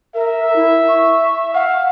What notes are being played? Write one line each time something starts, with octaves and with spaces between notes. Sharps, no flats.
A#4 E5
E4
C#6
F5 F#5